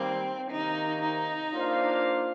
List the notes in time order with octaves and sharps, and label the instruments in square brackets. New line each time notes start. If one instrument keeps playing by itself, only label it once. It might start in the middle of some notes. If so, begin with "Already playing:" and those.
Already playing: [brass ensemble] D#3 G3 A#3 [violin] C4
[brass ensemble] C3 D#3 A#3 [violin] D#4
[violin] D#4
[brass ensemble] A#3 D4 F4 C5 F5